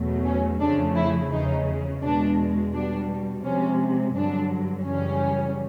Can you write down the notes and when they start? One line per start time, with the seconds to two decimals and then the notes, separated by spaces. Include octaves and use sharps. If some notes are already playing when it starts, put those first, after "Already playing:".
Already playing: E2 B2 F#3 A3
0.25 C#4
0.60 F2 C#3 F3 A3 D4
0.95 E4
1.31 E2 C#3 F3 D#4
2.02 E2 B2 G#3 D4
2.73 B2 G3 D4
3.43 C3 F3 G#3 C#4
4.15 G2 D3 F#3 D4
4.85 F#2 C#3 E3 G3 C#4